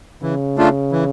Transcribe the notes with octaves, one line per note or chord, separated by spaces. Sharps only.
C#3 E3
A3 D4 F4
E3